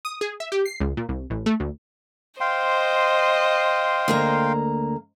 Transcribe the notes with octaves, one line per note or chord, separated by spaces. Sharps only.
D#6
G#4
E5
G4
C7
C#2
A#2
C2
A1
A3
D2
C5 D#5 F5 G5 C6
D2 A#3 A#5